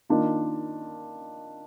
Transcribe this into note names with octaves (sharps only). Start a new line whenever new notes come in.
D#3 A#3 D4 F4